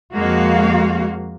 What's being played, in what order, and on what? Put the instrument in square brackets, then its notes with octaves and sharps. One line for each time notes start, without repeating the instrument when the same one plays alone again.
[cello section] F2 G#3 A#3 F#4 F5